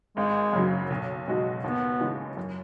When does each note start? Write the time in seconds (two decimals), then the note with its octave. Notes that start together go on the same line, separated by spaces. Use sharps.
0.17 G#1 G#3
0.53 F#2 C#3 F#3
0.90 B1
1.27 B2 G#3 D#4 F#4
1.64 D#2 B3
2.00 C#3 E3 G#3
2.37 F#2